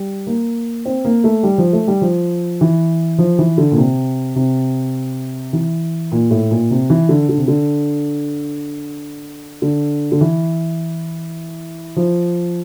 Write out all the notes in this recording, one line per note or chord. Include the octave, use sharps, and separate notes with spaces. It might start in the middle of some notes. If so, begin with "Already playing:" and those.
Already playing: G3
A#3
C4
A#3
A3
G3
F3
A3
G3
F3
E3
F3
E3
D3
A#2
C3
C3
E3
A#2
A2
A#2
C3
E3
D3
D3
C3
D3
D3
D3
E3
F3